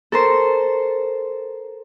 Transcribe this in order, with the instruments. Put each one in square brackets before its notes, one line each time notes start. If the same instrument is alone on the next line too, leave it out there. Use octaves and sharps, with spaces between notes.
[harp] A4 A#4 C5